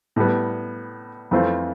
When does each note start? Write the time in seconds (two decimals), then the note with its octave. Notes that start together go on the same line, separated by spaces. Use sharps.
0.16 A2 G3 B3
1.31 F2 E3 A3 C4 F4